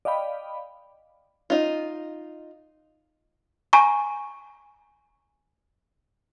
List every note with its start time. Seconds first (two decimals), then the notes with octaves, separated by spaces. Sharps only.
0.05 D5 D#5 F5 G5 B5
1.50 D#4 F4
3.73 G#5 A#5 C#6